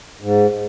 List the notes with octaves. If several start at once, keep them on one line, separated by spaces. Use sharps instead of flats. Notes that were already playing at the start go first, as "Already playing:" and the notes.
G#2